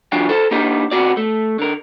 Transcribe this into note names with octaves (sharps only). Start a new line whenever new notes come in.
E3 F#3 D4 F4 G4
A4 C5
A#3 B3 D4 D#4 G4 B4
C3 B3 F#4 D5
A3
D3 A#4